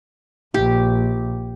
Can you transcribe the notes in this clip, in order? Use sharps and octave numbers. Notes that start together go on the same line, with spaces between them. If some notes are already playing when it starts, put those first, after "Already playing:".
A#1 G4